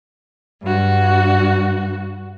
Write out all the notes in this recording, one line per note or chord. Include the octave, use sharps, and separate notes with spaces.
G2 F#4